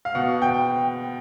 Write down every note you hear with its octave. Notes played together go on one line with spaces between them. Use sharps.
F5
B2 F#5
G5